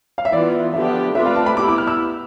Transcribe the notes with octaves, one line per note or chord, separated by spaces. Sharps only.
F5
E5
E3 B3 F4 D5
D3 F3 B3 D4 G4 E5
A3 C4 F4 B4 D5 E5
F5
A5
B5
B3 E4 G4 D6
D6
F6
E6